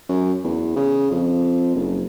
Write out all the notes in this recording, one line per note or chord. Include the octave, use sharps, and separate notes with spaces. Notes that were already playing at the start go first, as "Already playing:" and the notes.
F#2
E2
C#3
F2
F#1